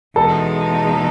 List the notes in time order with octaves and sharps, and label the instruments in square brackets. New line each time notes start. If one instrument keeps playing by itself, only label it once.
[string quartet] E2 B2 G#3 D#4 [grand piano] A4